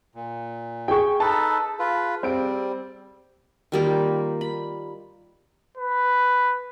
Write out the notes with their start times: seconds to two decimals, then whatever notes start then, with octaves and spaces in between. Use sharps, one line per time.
0.15 A#2
0.88 G#4 G5 C#6
1.20 D#4 A4 B4 A5
1.79 F4 B4
2.23 G3 C4 D7
3.72 D#3 G3 A#3 F4
4.41 B5
5.78 B4